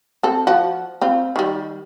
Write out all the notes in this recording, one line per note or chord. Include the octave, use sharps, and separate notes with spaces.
C4 A4
F3 F4 F#4
C4 F4
D#3 G3